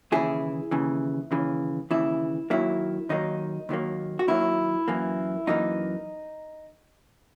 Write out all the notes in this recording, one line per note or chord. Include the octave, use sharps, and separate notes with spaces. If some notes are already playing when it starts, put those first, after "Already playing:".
D#2 C#3 E3 E4 G#4
D#2 C#3 E3
D#2 C#3 E3
D#2 C#3 E3 E4
D#2 D#3 F#3 A#3 E4
D#2 D#3 F#3 A#3 D#4
D#2 D#3 F#3 A#3
F#4
D#2 D#3 F#3 A#3 E4
F#2 E3 A#3
F#2 E3 A#3 D#4